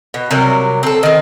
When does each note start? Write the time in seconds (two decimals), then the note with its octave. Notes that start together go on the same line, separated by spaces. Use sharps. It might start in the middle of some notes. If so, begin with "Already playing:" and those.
0.14 B2
0.31 C3 F#3 G3 A#4
0.83 C4 A4
1.03 D#3 C4